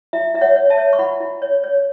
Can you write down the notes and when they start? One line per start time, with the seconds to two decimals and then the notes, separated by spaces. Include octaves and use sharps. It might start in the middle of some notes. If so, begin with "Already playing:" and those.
0.13 E4 E5
0.34 E4 E5
0.41 C#5 F#5
0.56 C#5
0.70 E5 A5
0.78 C#5
0.93 C#6
0.99 E4 F#5 B5
1.20 E4
1.42 C#5
1.64 C#5